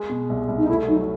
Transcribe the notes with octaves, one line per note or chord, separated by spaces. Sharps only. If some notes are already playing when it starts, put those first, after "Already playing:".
Already playing: G#3
B2
C2
C2
D#4
A3 E4
F#3 D#4